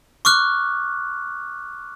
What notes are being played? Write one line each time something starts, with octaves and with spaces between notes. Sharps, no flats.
C#6 D6 F6 F#6